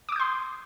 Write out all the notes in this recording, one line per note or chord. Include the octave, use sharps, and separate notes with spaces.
C6 D6 D#6 G6